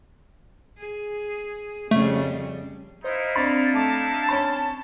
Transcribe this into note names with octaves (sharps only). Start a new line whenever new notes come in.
G#4
F2 C#3 G3 A3
D#4 E4 C5 D#5 F5
C4 D4 D5 B5 A6
A3 A5 D6
C#4 C#5 B5